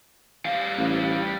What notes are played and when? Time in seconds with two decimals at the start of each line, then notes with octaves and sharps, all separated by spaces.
0.45 G3 F5
0.78 A1